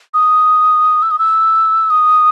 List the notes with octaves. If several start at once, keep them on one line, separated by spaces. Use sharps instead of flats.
D#6
E6
D#6
E6
D#6